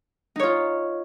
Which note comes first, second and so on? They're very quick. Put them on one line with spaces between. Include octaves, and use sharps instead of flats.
D#4 C#5 F4